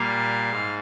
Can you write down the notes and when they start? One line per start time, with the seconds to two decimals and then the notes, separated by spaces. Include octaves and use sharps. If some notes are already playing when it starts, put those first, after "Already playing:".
Already playing: A#2 G3 A#3 F5
0.51 G#2